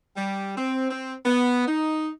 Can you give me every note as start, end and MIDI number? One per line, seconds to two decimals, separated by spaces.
0.17 0.53 55
0.57 0.89 60
0.91 1.14 60
1.25 1.65 59
1.67 2.09 63